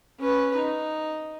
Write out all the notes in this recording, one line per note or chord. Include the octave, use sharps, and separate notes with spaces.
C#4 B4
D#4